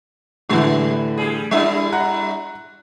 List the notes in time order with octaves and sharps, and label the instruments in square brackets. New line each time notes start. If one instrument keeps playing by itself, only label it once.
[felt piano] A2 D3 E3 [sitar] G3
[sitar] G3 G#4
[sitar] G3 D4 E4 [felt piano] E5
[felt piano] F#5 A#5 F#6